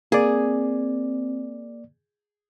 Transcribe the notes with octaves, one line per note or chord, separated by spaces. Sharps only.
A#3 C4 G#4 D5